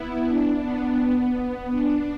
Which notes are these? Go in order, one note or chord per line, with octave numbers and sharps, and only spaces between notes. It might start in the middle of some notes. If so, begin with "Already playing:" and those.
Already playing: B3 E4
D4
B3
B3
D4